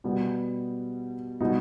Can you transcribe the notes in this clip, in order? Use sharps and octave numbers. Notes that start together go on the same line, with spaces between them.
B2 G3 B3
B2 G3 B3 D#4